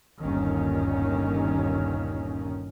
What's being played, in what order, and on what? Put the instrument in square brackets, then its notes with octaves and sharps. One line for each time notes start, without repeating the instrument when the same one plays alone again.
[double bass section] G1 D#2 A#2 D#3 C#4